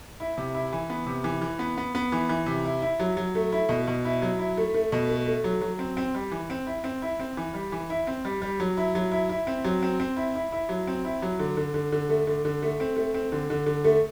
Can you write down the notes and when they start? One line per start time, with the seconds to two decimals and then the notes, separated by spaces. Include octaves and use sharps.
0.20 E4
0.38 C3
0.55 E4
0.72 E3
0.90 B3
1.06 C3
1.24 E3
1.41 E3
1.59 B3
1.78 B3
1.95 B3
2.12 E3
2.29 E3
2.46 C3
2.65 E4
2.82 E4
3.00 F#3
3.17 F#3
3.35 A3
3.52 E4
3.69 B2
3.87 B2
4.05 E4
4.22 F#3
4.39 E4
4.57 A3
4.74 A3
4.92 B2
5.09 A3
5.26 A3
5.44 F#3
5.61 F#3
5.79 C4
5.97 C4
6.14 G3
6.32 E3
6.50 C4
6.67 E4
6.84 C4
7.02 E4
7.19 C4
7.37 E3
7.54 G3
7.72 E3
7.90 E4
8.07 C4
8.25 G3
8.42 G3
8.60 F#3
8.77 E4
8.95 F#3
9.11 E4
9.29 E4
9.47 C4
9.64 F#3
9.82 C4
10.00 C4
10.17 E4
10.35 E4
10.52 E4
10.69 F#3
10.87 C4
11.05 E4
11.22 F#3
11.39 D3
11.57 D3
11.74 D3
11.92 D3
12.09 A3
12.27 D3
12.45 D3
12.62 A3
12.80 C4
12.96 A3
13.14 C4
13.32 D3
13.50 D3
13.66 D3
13.84 A3